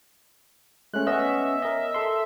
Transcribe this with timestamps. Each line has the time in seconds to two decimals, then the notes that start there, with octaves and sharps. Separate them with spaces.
0.94 G#3 A3 C#4 F#6
1.07 B3 C#4 D#5 E5
1.62 A#4 D#5
1.94 A4 C6